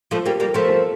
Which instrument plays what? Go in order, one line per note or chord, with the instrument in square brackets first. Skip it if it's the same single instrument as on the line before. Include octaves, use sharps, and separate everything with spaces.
[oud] F3 A3 [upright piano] F4
[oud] G3 A#3 [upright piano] G4
[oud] G3 A#3 [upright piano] A#4
[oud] F3 A3 [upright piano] A#4
[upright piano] A4